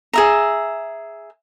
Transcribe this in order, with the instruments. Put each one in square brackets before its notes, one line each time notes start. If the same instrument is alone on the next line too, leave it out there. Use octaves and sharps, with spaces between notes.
[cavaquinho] G#4 E5 A#5